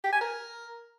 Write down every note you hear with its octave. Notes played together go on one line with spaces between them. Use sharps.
G4
G#5
A#4